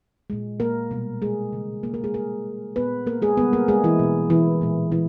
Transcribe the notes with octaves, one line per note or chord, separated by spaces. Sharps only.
A#2 G#3
A#3 A#4
B2 G3 A#3
G#3 G#4
C#3 E3 G3 A#3
A#3 A#4
A#3 A#4
G#3 G#4
C#3 G3 A#3 A#4
A#2 A#3 B3 B4
A#3 A#4
G#3 G#4
C#3 G3 A#3 B3 B4
A#3 A#4
G#3 G#4
E3 E4
B2 G#3
E3 E4
A#2 G#3
E3 E4